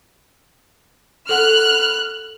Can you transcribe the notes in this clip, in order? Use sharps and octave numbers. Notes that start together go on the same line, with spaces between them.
A4 F#5 F6 F#6